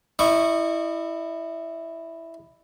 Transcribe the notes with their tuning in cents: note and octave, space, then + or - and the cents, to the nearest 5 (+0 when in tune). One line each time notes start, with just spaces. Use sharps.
E4 +0 D#5 -40 C#6 +0